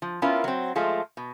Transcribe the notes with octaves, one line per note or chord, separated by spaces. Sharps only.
F3
B3 C#4 E4 F4 A#4
F#3 C4
F3 G#3 A3 F4
B2